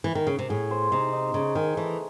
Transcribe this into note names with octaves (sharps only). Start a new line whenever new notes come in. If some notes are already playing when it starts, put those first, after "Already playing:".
E3
D#3
C#3
C3
A2 G#4
C5
C3 D#4
D#4
C#3 D#4
D#3 G#4
E3 A3